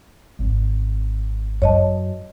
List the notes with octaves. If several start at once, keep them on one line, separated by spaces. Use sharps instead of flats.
G#1
F#2 C#5 D#5 A5